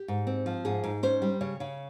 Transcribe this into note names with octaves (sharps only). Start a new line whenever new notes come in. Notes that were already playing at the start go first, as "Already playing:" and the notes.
Already playing: G4
G#2
C4
F3
G#2 G#4
G#2
C#4 C5
G3
C#3 C#5
C#3